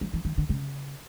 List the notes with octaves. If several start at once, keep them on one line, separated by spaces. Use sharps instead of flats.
F3
E3
D#3
D3
C#3